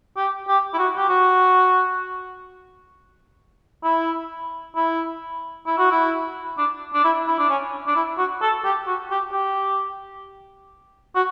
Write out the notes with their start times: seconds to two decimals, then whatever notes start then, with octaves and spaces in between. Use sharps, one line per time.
0.17 G4
0.48 G4
0.74 E4
0.78 F#4
0.96 G4
1.08 F#4
3.83 E4
4.75 E4
5.66 E4
5.78 F#4
5.91 E4
6.58 D4
6.94 D4
7.04 E4
7.27 E4
7.39 D4
7.49 C#4
7.87 D4
7.95 E4
8.18 F#4
8.42 A4
8.64 G4
8.87 F#4
9.11 G4
9.32 G4
11.15 F#4